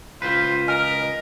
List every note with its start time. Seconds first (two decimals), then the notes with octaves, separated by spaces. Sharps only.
0.22 C#2 F4 B4 C5
0.68 A#4 D#5 G#5 F6